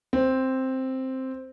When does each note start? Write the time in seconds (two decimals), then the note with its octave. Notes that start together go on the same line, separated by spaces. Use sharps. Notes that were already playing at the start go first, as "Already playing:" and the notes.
0.13 C4